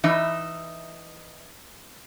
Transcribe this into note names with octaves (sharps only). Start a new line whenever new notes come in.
E3 D#4 E5